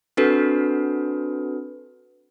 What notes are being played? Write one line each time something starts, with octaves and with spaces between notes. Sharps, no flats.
C4 D4 F#4 A4 B4